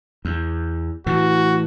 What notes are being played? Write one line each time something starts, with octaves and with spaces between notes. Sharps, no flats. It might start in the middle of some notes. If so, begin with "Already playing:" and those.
E2
A2 E3 F#4